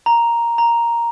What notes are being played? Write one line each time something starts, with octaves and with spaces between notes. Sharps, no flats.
A#5
A#5